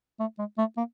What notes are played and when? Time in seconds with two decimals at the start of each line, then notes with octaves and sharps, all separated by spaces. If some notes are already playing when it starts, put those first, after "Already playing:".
0.20 A3
0.39 G#3
0.58 A3
0.77 A#3